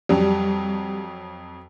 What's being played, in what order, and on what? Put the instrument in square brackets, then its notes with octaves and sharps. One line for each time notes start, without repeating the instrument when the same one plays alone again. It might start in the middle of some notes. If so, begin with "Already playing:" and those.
[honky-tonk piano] F2 F#3 [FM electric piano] G3